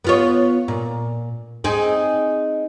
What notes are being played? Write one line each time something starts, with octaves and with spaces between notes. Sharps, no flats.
B3 F4 C#5
A#2
C4 D#4 G#4